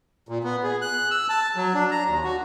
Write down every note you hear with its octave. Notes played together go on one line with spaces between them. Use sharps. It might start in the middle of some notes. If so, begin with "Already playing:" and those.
A#2
B3
G#4
F#6
E6
A5
F#3
D4
A#5
D#2
F#4